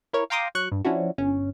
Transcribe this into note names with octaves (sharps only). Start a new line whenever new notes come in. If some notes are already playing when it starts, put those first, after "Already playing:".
E4 A#4 C#5
F5 G5 A#5 C6 D6 D#6
F#3 C#6 F#6
G2
F3 C#4 D4 E4 F#4
G1 C#4